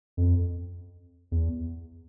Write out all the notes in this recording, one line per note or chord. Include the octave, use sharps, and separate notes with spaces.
F2
E2